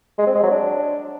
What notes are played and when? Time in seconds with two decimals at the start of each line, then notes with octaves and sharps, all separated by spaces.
0.18 G#3
0.27 C4
0.35 G#3
0.43 F#3
0.51 D4